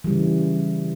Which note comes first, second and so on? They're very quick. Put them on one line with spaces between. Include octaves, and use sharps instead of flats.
E3 G3 C#3